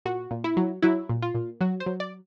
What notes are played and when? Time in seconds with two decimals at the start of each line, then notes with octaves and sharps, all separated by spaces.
0.05 A#2 F#4
0.31 A#2
0.44 E4
0.57 F#3
0.82 F#3 E4
1.09 A#2
1.22 F4
1.34 A#2
1.61 F#3 F#4
1.80 C5
1.86 F#3
2.00 D5